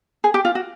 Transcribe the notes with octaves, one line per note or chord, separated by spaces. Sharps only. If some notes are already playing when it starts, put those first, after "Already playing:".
G#4
G4
F4
F#4